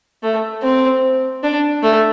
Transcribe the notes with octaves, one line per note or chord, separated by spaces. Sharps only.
A3
C4
D4
A3